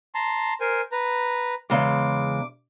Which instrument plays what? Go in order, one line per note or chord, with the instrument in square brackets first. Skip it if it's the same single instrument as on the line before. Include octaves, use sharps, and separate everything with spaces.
[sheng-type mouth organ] A5 A#5 C6
A#4 C5 G#5
B4 A#5
[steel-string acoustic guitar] E2 C#3 G#3 [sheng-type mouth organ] D6